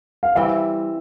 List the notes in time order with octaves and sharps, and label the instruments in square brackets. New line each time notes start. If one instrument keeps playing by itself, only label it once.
[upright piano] F5
[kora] E3 G3 C4 [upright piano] E5